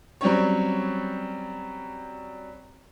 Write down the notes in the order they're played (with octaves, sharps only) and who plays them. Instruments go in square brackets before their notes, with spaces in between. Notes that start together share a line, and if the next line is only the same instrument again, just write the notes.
[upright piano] F#3 G3 C4 C#4 C#5